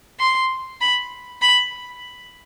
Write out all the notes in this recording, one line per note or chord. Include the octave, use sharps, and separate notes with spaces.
C6
B5
B5